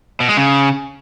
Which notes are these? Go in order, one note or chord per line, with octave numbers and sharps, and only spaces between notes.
B2
G#3
C#3